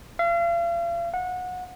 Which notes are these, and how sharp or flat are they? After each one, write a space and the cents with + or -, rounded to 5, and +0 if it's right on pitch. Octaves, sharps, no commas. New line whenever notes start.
F5 -40
F#5 -25